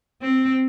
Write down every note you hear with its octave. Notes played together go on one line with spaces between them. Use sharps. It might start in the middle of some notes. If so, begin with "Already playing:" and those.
C4